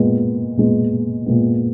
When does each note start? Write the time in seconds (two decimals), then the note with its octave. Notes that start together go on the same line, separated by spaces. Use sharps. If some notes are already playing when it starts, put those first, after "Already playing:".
Already playing: A#2 G#3 B3
0.57 A#2 G#3 B3
1.26 A#2 G#3 B3